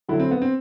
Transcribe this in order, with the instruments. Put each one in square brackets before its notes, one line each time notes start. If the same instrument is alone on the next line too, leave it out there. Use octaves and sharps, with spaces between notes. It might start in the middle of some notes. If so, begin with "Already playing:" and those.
[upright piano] D3 F#3 A3 [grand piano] E4
[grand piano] C4
B3
C4